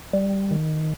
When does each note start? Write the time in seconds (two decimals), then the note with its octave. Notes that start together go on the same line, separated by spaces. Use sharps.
0.13 G3
0.51 D#3